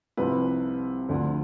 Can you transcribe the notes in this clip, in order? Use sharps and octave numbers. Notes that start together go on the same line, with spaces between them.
C2 C3 F3 B4
D2 D3 F3